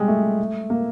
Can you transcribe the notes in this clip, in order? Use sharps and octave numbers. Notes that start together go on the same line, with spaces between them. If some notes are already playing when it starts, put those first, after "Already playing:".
Already playing: G3 G#3
A3
A#3